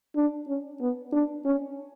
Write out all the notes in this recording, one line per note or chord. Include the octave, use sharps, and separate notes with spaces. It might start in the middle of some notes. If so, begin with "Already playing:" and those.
D4
C#4
B3
D4
C#4